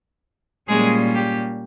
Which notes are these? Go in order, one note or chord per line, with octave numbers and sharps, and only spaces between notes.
A#2 G3 G#3 A#3 C#4 G#4
G4